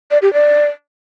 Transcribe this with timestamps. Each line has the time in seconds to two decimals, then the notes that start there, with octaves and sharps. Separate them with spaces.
0.11 D5
0.22 G4
0.33 D5